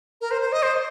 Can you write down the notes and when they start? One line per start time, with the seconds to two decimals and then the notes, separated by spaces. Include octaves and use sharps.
0.21 A#4
0.31 C5
0.41 C5
0.52 D#5
0.63 C5